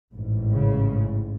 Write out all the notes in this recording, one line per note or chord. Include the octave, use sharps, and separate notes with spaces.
A1 G#2
C#3